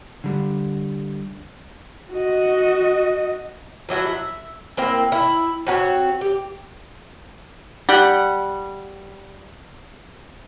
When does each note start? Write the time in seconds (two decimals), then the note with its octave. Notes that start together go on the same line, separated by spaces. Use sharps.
0.24 D3 G3
2.12 F#4 D#5
3.89 F3 F#3 E4 F#4
4.07 E5
4.77 A#3 C4 E4
5.12 E4
5.67 C4 F#4 A#4 C#5
6.21 G4
7.89 G3 G4 F#5